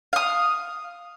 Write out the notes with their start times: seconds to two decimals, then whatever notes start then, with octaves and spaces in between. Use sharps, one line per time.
0.13 F5 D#6